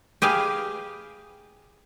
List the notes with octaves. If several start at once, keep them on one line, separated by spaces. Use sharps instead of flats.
G4 G#4 B4 F5